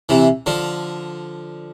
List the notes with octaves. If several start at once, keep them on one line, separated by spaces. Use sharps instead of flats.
C3 E3
D3 F3